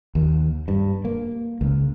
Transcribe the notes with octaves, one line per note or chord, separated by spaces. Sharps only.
D#2
G2
A#3
C#2